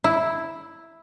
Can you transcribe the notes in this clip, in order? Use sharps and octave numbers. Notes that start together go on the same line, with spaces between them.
E4